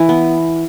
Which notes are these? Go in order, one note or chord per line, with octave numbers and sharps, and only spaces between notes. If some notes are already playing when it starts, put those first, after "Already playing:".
Already playing: E3
B3